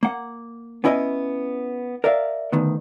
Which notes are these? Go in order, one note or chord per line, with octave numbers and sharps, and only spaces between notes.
A#3 F#5
B3 C#4 E4 D#5 F#5 G#5
A#4 D5 E5 F5
D2 D#3 B3